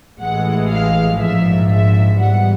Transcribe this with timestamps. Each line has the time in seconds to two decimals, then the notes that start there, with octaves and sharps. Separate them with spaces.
0.19 A1 A2 E3 G#3 F#5
0.68 F5
1.18 A#1 G#2 F3 E5
1.68 E5
2.18 G#2 E3 G3 B3 F#5